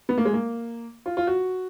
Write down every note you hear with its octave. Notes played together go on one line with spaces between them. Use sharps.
B3
A#3
G#3
A#3
F4
F4
F#4